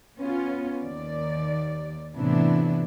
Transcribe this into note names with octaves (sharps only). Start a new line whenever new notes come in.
B3 C#4 F4
D#2 D#3 D5
A2 C3 E3 B3 D4 E4